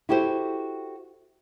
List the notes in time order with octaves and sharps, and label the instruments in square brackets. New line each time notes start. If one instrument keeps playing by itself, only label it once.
[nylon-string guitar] E4 F#4 G4 A4 C5